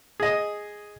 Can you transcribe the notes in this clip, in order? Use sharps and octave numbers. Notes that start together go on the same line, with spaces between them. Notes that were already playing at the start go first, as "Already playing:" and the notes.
G#4 D#5